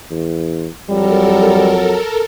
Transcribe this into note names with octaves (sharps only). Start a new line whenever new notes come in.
E2
F2 F#3 G3 A4 A#4